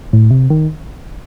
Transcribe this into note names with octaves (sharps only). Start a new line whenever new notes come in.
A2
C3
D#3